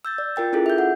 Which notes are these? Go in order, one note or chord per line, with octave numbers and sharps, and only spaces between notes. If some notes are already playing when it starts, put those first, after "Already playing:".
E6 G6 A6
D5
F4 A#4 G5 A6
C#4 E4 F4 G#4 A4
E5 G6
F#5